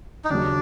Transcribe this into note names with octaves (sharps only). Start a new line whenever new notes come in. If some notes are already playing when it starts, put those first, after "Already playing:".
D#4
D#2 C#3 F#3 D4